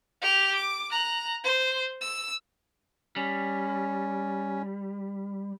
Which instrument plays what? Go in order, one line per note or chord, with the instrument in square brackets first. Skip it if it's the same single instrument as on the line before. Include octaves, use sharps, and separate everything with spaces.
[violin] G4 F7
D6
A#5 F#6
C5
E6
[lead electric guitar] G3 [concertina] C#4